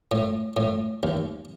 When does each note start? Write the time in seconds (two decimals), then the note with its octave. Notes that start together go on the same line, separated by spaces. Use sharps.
0.11 A2
0.57 A2
1.03 D#2